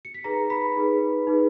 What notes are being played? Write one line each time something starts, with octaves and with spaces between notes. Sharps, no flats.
C#7
B6
D#4 G#4 B4 A#5 A#6
B5 B6
D#4 G#4 B4
D#4 G#4 B4